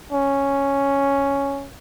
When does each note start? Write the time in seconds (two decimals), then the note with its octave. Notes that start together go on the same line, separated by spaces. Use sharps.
0.12 C#4